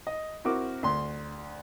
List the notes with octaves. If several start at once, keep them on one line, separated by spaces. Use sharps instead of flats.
D#5
C4 E4 F#4 A#4 D6
D2 C6